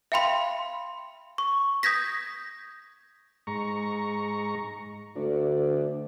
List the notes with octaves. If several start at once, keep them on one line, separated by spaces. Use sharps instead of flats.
E5 F5 G5 B5 C6
C#6
D#6 G6 G#6 A#6 B6
G#2 A#5 C#6
D2 D4